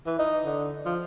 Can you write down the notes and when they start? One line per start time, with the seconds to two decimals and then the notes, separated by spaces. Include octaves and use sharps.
0.07 E3
0.19 D#4
0.45 D3
0.86 F3